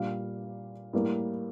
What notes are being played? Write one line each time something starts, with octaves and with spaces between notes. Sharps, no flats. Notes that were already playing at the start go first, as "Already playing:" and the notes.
Already playing: A#2 G3 A#3 F5
A2 G3 A#3